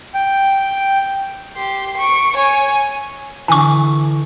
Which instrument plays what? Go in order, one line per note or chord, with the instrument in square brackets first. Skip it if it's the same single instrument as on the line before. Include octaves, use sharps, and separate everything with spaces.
[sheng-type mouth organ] G5
[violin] G4 C6
C#6 D7
C#5 G#5
[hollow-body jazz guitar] D3 E3 [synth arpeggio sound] G#5 C#6